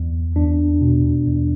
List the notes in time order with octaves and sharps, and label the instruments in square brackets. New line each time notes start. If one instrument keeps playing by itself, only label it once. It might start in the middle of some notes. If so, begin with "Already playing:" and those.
Already playing: [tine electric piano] E2
E2 D4
B2
E2